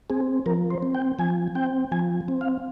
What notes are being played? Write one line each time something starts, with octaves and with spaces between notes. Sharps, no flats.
C4 G#4
F3 A#4
C5
C4
G5
F3 G#5
C4 G5
F3 G#5
C4
F5